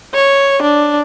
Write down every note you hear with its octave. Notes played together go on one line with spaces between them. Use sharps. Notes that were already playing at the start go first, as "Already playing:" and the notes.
C#5
D4